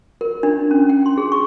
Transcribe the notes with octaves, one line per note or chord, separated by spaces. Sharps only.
A#4
D4
C#4
G5
C6
G#4
C#6